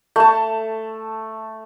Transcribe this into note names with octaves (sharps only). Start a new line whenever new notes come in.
A3 A5